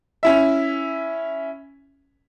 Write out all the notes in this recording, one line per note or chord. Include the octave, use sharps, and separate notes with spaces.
C#4 E4 E5